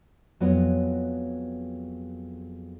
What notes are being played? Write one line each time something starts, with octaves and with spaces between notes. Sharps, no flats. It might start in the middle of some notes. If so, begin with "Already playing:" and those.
F2 F#3 G#3 B3 E4 C#5